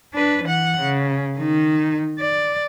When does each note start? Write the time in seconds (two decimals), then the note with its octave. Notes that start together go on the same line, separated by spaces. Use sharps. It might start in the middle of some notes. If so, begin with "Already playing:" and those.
0.14 D4 B4
0.43 E3 F#5
0.80 C#3
1.38 D#3 D#4
2.19 D5